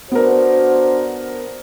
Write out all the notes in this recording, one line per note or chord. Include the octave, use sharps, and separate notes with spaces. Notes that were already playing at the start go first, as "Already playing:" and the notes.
B3 D4 F#4 A#4 C5